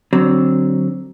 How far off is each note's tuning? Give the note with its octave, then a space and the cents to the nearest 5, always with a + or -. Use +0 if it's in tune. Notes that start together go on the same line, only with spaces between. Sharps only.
D3 +0 F#3 +15 C4 +10